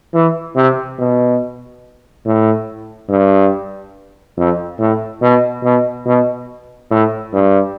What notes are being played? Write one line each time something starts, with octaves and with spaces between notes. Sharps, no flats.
E3
C3
B2
A2
G2
F2
A2
B2
B2
B2
A2
G2